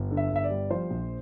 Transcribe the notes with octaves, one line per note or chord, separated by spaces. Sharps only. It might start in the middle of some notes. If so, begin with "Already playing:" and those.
Already playing: G1
D3
E5
G1 E5
D5
G3
F3 C5
A#1